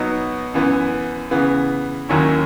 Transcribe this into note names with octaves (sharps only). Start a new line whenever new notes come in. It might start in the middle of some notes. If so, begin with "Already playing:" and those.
Already playing: B2 F#3 B3 D#4
F#2 E3 B3
C#3 E3 B3
D#2 D#3 F#3 C#4 E4